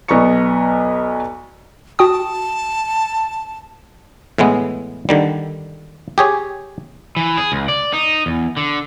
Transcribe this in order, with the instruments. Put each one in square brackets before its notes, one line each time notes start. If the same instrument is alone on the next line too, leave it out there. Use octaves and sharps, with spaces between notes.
[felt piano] B1 B3 D5 A#5 C#6 C#7
[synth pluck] F#4 G5 D#6 [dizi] A5
[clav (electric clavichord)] A2 E3 G#3 B3
D3 D#3 G3
G4 G#4 C#5
[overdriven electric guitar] E3
G#4
C#2
D5
D#4
E2
D3